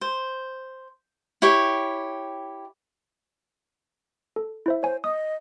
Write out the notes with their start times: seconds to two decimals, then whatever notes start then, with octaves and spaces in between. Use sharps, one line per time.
0.01 C5
1.42 E4 G4 C#5 G5
4.36 A4
4.66 E4 C5 E5
4.83 C5 C#5 G#5
5.04 D#5 D#6